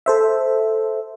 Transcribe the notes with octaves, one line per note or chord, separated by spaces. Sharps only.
A4 C5 E5